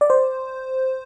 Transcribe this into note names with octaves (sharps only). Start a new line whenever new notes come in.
D5
C5